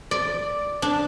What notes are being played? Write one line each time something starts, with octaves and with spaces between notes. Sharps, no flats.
D5
D4